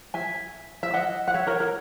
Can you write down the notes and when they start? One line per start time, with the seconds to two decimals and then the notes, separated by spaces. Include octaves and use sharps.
0.14 E5 G#5
0.83 E5
0.94 D#5 F#5
1.28 F#5
1.34 C#5 E5
1.47 A#4 C#5
1.60 A#4